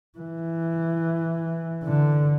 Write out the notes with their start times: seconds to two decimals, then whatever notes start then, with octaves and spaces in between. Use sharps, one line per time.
0.19 E3
1.84 D3